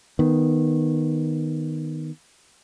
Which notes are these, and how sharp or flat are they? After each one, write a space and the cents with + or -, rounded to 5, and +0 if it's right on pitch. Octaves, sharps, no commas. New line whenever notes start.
D#3 +0 B3 +0